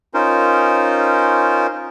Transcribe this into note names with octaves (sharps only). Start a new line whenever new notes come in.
C#4 D#4 F4 A#4 C5